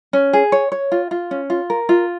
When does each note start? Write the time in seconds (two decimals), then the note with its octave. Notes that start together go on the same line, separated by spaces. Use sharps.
0.13 C#4
0.33 G#4
0.52 C#5
0.72 C#5
0.92 F4
1.11 F4
1.31 C#4
1.50 F4
1.70 A#4
1.89 F4